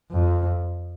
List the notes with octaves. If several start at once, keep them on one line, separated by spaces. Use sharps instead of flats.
F2